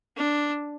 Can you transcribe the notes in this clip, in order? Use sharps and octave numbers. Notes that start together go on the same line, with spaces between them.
D4